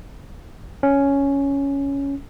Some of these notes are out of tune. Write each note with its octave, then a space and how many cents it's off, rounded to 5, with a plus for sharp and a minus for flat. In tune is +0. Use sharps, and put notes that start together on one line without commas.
C#4 +5